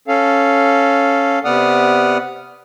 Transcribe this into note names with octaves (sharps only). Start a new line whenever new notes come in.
C#4 A4 F5
C3 B3 D5 F#5 D#6 F6